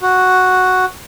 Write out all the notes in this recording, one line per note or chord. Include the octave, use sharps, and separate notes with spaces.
F#4